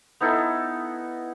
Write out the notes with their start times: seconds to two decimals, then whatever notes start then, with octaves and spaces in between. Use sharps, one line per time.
0.21 B3 D#4 E4 A4